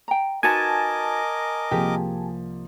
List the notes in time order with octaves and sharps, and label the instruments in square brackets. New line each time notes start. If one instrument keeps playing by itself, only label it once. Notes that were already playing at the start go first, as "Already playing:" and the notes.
[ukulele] G5 A#5
[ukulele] D#4 F#4 B4 [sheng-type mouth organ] A#4 D#5 D6 [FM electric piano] G#5 A5
[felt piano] C2 F3 A#3 [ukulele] G4 G#4